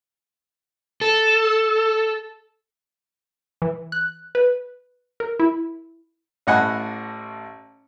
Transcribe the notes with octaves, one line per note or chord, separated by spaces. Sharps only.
A4
E3
F#6
B4
A#4
E4
A1 A2 D#5 F#5 G#5 B5